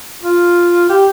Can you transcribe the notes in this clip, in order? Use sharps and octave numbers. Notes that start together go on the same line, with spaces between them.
F4
G4